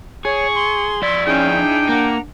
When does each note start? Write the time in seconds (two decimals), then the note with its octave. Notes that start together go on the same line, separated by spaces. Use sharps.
0.25 G#4 C#5 C#6
0.56 C6
1.02 F2 E4 D5
1.26 C#4 D#4 E4 G#4 G5
1.54 D4
1.89 A#3 A#4 F#5 A#5